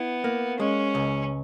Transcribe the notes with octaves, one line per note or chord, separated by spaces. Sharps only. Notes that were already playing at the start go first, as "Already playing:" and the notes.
Already playing: B3 E4
A#3
G#3 C#4
C#2